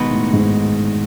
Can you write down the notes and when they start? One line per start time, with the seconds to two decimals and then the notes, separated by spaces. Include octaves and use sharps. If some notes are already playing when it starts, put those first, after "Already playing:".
Already playing: B2 D#3 G#3 D#4 F#4 B4
0.10 A2
0.33 G#2